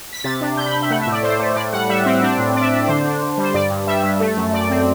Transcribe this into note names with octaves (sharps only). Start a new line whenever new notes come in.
B6
C3 A6
D4
C3 G6
B5
C3
E5
A3 F#5
E5
A2
D5
A2 C5
A3
A2 D5
G3 F#5
G3 E5
C4
D4
A2
D4 D5
E5
D5
D4
D5
D3 C5
D4
D3
G3
C5
G2 D5
G2
G3 E5
G2
A3
F#2
F#2 D5
C4